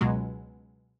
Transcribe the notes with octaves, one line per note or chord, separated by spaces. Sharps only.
C#2 B2 F#3 G#3